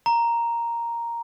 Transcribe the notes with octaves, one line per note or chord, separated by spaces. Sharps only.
A#5